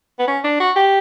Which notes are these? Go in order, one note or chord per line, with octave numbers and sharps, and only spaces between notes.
B3
C#4
D4
F#4
G4